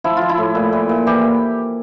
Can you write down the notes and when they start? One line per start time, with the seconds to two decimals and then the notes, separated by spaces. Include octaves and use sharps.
0.04 F3 E4
0.17 F3 F4
0.29 E4
0.38 A2
0.55 A#2
0.73 A#2
0.89 A#2
1.07 E3 G4